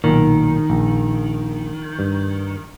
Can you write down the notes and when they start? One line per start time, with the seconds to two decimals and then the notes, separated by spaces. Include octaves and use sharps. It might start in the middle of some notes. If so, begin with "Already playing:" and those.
0.04 B1 A#2 D#3
0.70 A#1
1.99 G2